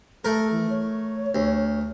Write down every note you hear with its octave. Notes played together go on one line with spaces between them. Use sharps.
A3 A4 A#4
E3
C#5
D2